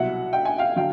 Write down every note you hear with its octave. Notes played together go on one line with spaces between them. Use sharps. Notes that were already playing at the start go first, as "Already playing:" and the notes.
Already playing: C2 B2 F#3 E5 F#5
G5
G#5
F5 G5
D3 F#3 F5 G5